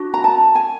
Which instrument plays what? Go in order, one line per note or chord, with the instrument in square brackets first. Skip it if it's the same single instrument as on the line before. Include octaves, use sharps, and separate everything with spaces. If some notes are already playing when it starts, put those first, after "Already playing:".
Already playing: [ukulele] D4 F#4
A#5
A5
G#5